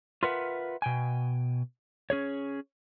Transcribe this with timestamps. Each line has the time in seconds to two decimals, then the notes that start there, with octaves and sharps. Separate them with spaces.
0.23 F4 A#4 B4 E5 F#5
0.82 B2 G5 G#5
2.10 C#4 G#4 C#5